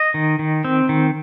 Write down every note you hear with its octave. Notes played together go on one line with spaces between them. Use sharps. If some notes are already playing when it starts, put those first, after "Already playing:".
Already playing: D#5
D#3
D#3
C4
D#3